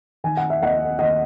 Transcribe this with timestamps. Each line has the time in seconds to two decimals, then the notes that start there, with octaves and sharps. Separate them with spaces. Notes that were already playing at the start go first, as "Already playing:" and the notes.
0.24 D#3 G#5
0.37 F#5
0.50 E5
0.61 D#2 D#5 F#5
0.99 D#2 D#5 F#5